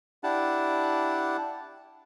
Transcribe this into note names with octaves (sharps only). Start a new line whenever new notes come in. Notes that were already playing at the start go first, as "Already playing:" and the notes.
D4 E4 G4 F#5 A5